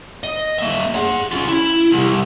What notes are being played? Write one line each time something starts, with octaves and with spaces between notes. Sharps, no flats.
D#5
A#3 E5
G#4 F#5
C#4 F4
E4
C2